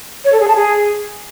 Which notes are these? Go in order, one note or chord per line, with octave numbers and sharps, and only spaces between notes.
C#5
A4
G#4
A5
G#4